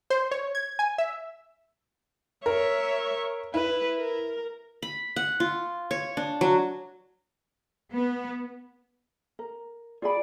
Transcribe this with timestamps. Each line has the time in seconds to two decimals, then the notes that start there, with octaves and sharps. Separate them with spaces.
0.10 C5
0.31 C#5
0.55 G#6
0.79 G#5
0.98 E5
2.46 A#4 C#5 E5
3.54 E4 B4
3.98 A#4
4.82 B5
5.16 F#5
5.40 F4
5.91 C#5
6.17 D4
6.41 F#3
7.92 B3
9.39 A#4
10.02 F4 G#4 D5 B5